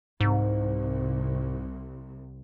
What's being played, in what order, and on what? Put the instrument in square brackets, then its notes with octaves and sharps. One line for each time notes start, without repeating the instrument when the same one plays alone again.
[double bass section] C2 [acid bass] G#2